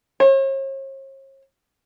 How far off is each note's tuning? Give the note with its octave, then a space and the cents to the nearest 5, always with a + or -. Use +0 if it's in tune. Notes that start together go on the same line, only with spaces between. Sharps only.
C#5 -45